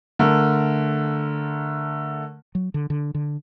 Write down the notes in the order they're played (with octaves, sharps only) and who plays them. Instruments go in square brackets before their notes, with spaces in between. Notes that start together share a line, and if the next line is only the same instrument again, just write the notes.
[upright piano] D3 A3 A#4
[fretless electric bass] F#3
D3
D3
D3